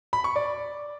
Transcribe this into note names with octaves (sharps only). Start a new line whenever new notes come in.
B5
C#6
D5